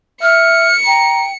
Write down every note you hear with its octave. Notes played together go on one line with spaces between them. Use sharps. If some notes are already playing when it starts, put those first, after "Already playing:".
E5 F6 C#7
G5 A#5